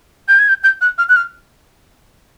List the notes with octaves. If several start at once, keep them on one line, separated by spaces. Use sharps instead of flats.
G6
G#6
G6
G6
F#6
F6
F#6
F6